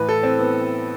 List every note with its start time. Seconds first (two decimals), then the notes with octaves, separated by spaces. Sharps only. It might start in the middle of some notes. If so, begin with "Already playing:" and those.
Already playing: A2 E3 B4
0.09 A4
0.23 C4
0.39 B3